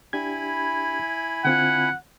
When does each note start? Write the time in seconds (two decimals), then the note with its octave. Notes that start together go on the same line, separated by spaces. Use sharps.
0.13 D4 E4 G4 G#5 B5 G#6
1.45 D3 C4 F4 F#5